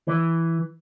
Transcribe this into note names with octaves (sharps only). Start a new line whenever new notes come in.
E3